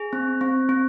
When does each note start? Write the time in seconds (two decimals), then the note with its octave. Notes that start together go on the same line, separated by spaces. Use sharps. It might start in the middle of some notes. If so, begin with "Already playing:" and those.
Already playing: G#4
0.13 C4
0.41 C4
0.69 C4